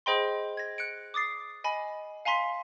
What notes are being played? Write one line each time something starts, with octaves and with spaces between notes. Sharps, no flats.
G#4 C5 D#5 G5 B5 C6
G#6 A#6
F#6 C#7 D7
D6 D#6 A6 C7
D#5 G#5 B5
F5 G#5 A#5 C6 B6